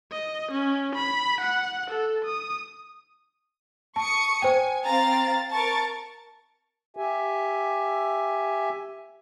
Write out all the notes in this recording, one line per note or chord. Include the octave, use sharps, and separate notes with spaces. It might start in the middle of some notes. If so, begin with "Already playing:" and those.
D#5
C#4
B5
F#5
A4
D#6
A5 C#6 D#6 C#7
C5 G5 G#5
C4 F5 A#5 A6
A#4 A5 C#6 A6
G4 E5 G#5